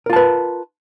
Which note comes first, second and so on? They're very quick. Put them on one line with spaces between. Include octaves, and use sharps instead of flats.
A#4 F4 A5 B4